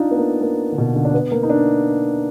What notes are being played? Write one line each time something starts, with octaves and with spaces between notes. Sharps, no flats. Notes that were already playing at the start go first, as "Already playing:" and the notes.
Already playing: D4 D#4 F4
B3
A#3
A#3
D3
B2
D3
D4
B3
A#3
D#4
D4